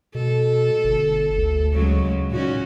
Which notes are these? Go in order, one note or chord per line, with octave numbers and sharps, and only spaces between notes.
B2 A4
G1
D2
C#3 F#3 G#3
A#2 C#4 D#4 F#4